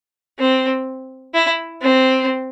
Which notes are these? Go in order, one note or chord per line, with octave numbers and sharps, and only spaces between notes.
C4
E4
C4